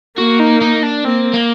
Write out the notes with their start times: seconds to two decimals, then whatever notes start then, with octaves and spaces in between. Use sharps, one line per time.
0.18 A#3 F#4
0.40 D#4
0.62 D#4
0.83 D4
1.05 A#3 C4
1.34 A#3